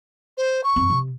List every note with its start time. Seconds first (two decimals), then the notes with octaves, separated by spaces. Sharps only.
0.37 C5
0.64 C#6
0.76 F#2 C4
0.90 C3